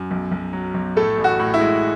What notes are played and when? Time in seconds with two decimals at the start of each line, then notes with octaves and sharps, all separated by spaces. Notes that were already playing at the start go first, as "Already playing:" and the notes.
Already playing: F#2
0.11 B1
0.32 B1
0.53 F#3
0.74 B1
0.96 A2 A3 A4
1.17 A1
1.24 F#4
1.39 A2
1.54 E4
1.60 G#3